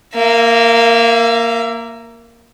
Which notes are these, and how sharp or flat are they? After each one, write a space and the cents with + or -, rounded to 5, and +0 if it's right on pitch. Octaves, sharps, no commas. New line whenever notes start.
A#3 -5 E5 +35